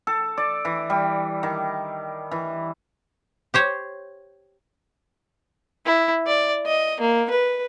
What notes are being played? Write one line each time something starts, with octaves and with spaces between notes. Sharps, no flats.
A4
D5
E3
G3
D#3
E3
G4 C5 C#5
E4
D5
D#5
A#3
B4